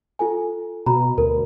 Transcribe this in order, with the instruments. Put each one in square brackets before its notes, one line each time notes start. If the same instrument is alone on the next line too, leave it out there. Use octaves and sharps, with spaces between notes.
[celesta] F4 A4 G#5
[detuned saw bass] B2 [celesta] A#5 B5
[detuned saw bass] D2 [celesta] A#4